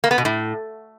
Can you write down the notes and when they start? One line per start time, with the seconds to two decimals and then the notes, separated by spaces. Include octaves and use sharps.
0.04 A#3
0.11 B3
0.18 B2
0.25 A2